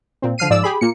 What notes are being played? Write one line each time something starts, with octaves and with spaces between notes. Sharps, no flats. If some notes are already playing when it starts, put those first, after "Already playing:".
A#2 C4
D3 F3 F6 C7 D#7
G#2 F3 D5 E6
G4 G#4 B5
A#2 A#3 C#7